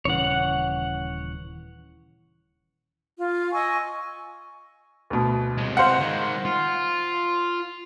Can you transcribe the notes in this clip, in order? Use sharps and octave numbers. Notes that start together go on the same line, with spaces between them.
D#1 C#3 E3 C#5 F#5
F4
D#5 G#5 C#6 E6
D2 B2
C3 G#3
C5 F5 F#5
D#3 G#3
F4